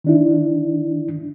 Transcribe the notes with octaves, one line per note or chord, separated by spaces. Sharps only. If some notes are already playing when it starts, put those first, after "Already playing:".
D#3 D4 E4